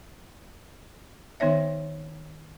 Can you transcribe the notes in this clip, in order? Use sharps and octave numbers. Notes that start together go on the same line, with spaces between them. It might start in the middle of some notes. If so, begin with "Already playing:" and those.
D#3 B3 D#4 C#5 E5